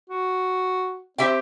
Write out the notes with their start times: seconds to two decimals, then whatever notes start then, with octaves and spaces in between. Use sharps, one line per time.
0.09 F#4
1.18 C4 G4 E5 G5